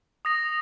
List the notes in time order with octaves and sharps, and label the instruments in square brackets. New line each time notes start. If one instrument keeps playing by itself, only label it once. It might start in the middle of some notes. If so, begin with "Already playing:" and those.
[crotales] D#6 A#6 F7